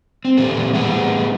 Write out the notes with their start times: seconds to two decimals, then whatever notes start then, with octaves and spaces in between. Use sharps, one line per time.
0.25 C4
0.37 A#2 E3 G3 E4 A4
0.73 A2 G3 B3 G#4 F#5